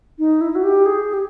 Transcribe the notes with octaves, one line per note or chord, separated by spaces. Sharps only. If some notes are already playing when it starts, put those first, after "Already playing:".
D#4
E4
F#4
G4
G#4
G4